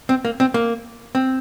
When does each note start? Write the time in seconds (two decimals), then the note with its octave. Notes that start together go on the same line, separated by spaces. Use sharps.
0.09 C4
0.25 A#3
0.40 C4
0.54 A#3
1.15 C4